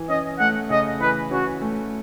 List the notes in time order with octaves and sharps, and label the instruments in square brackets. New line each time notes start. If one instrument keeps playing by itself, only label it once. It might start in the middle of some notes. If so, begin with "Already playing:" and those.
Already playing: [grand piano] E3
[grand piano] C#4 [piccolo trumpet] D#5
[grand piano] A3 [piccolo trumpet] F#5
[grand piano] C#3 [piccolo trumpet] D#5
[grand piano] E3 [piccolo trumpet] B4
[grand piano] C#4 [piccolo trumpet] F#4
[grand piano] A3